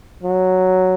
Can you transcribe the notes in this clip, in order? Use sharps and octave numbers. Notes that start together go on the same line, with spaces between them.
F#3